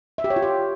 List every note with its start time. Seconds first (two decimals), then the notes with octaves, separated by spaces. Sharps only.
0.18 E5
0.24 G4
0.30 C#5
0.36 F4
0.42 G4